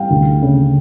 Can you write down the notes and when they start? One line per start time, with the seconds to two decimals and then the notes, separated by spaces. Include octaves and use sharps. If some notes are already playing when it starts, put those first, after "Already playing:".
Already playing: E3 G3 F5 G5
0.10 D2
0.42 C#3